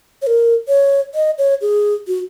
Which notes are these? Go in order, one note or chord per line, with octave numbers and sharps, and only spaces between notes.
C#5
A#4
C#5
D#5
C#5
G#4
F#4